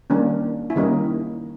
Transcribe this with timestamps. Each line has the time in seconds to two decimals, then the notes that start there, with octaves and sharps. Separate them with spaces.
0.10 D#3 G3 A#3 C#4 D4
0.70 E4
0.76 D#3 G3 A#3 C#4 D#4